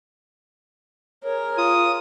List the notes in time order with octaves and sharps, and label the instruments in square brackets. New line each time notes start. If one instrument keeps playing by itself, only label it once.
[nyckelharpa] G#4 A#4 [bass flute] C#5
[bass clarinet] F4 [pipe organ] D#6